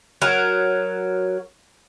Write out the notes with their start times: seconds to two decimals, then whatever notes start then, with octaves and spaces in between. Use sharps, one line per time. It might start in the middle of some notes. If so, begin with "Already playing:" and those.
0.22 F#3 A#4